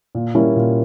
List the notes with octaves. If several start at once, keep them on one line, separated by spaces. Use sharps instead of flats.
A#2
G3 A#3 C#4 E4
A#2